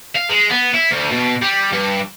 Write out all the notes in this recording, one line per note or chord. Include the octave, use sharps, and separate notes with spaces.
F5
G#3
B3
E4
D2
B2
G3
G2